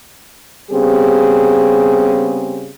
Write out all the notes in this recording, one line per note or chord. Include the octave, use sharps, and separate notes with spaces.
C#3 G3 B3 C4 G4 G#4